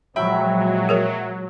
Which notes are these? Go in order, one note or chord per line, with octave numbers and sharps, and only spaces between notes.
A#2 F3 F#3 G#3 E5 G5 B5
G#4 A#4 C#5